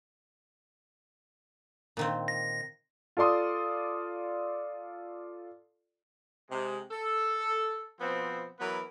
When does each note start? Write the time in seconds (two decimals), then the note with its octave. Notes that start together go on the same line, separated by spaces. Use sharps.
1.97 A#2 D#3 C4
2.28 A#6
3.17 F4 A4 D5 C6 D#6
6.50 C3 G#3
6.91 A4
8.00 B2 F3 B3 C4
8.60 E3 F#3 B3 A#4 B4